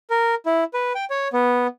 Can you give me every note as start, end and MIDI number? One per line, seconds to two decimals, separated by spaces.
0.10 0.35 70
0.46 0.64 64
0.74 0.93 71
0.95 1.05 79
1.10 1.28 73
1.33 1.67 59